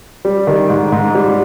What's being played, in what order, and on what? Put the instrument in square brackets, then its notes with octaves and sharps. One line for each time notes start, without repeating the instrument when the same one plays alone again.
[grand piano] G3
D#3
G#2
G#2
G3